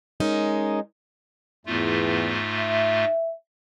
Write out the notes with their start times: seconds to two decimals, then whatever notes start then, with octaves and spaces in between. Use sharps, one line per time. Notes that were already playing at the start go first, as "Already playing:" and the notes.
0.20 G#3 C#4 D#4 A#4
1.66 E2 G#2 A3 F4
2.54 E5